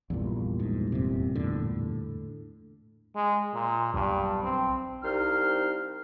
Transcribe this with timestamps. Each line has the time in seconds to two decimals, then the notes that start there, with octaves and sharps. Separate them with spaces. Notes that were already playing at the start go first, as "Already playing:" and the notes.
0.10 A#1 E2 G2 A#2
0.60 G#2
0.92 F1 C3
1.35 A2 D3
3.16 G#3
3.54 A#2
3.94 B1 G2
4.43 C4
5.03 C2 D#4 C5 F5 F6